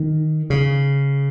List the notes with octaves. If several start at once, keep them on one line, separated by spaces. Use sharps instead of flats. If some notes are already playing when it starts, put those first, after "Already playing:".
Already playing: D#3
C#3